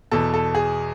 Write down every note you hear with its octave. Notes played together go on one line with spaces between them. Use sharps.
E2 B2 A4
A4
G#4